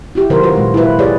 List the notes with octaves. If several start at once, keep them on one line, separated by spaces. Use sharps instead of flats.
E4 F#4 G4
C3 D#3 F#3 A#4 C5
F4 F#4 B4
A#2 G#3
E4 F4 B4
G4 G#4 B4 C#5 D5